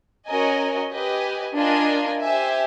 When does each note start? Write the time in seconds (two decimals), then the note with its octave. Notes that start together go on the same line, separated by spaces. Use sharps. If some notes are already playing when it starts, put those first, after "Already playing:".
0.26 C#4 F#4 A#4 D#5 G#5
0.91 G4 B4 D#5 G#5
1.54 D4 F4 A#4 D#5 G#5
2.19 G4 C5 E5 G#5